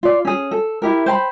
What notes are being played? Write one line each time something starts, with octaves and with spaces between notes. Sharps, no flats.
F4 D5
C#4 G#4
A4
E4 G4 A#4
C5 G5 A#5 B5